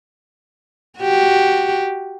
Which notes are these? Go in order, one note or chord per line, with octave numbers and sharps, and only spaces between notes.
F#4 G4